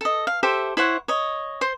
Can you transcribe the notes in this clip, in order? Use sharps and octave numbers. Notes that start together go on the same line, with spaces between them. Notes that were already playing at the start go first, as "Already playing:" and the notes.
A4 D#5
F5
G4 A4 C5 E5
E4 C5 C#5 F#5
C#5 D#5
C5 C6